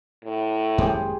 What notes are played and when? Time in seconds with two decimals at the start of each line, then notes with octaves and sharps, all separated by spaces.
0.24 A2
0.78 G#1 F#2 A#3 G4 G#4 C5